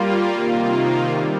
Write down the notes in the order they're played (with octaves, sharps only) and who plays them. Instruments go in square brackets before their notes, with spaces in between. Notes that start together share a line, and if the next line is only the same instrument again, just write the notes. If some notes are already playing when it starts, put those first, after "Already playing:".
Already playing: [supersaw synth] G3 A#3 F4
C3 D#3 A#3 F4
C3 G3